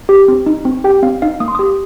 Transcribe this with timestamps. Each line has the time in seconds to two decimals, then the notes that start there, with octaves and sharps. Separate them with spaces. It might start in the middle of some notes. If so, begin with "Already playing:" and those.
0.09 G4
0.28 C4
0.46 D#4
0.65 C4
0.84 G4 G5
1.03 C4 F5
1.22 D#4 F5
1.40 A#3 D#6
1.48 C6
1.55 G4 D#6